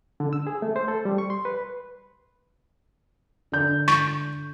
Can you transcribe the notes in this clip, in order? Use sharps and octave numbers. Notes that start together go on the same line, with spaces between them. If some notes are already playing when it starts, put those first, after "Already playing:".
D3
E6
G#4
A3
C5
A4
G3
C#6
C6
B4
D3 G6
C#6